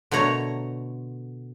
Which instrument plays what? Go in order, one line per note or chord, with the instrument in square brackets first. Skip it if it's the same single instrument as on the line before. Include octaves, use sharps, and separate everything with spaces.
[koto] B2 D3 A3 C#5 A#5